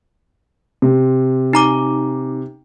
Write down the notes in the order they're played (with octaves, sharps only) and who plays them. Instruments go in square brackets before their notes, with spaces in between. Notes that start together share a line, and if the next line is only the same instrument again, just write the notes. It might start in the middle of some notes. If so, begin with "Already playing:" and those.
[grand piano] C3
[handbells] D#4 A#5 D6